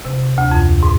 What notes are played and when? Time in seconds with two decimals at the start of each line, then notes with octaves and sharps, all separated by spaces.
0.05 C3
0.38 D2
0.51 F2
0.83 G#2